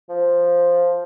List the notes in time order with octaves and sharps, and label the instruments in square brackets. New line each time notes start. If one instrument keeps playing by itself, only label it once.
[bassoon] F3